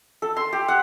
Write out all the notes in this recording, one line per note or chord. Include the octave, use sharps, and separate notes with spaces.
A4
C6
G4
F#5